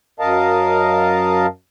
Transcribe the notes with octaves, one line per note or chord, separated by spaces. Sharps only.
F#2 A#4 D#5 F5 A5